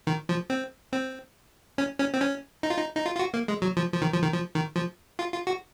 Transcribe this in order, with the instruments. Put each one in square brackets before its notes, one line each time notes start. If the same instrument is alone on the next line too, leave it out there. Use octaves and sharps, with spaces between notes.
[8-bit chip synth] D#3
F3
C4
C4
C#4
C#4
C4
C#4
D#4
F4
D#4
D#4
F4
F4
F#4
A#3
G#3
F#3
F3
F3
D#3
F3
D#3
F3
D#3
F3
F4
F4
F#4